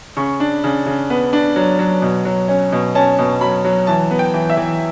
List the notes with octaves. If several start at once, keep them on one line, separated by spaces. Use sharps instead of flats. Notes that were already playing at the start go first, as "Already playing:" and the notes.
C#3 C#6
D4
C#3
C#3
B3
D4
F#3
F#3
B2
F#3
C#4
B2
C#4 A5
B2
F#3 B5
F#3
E3 A5
B3
G5
E3
E5
E3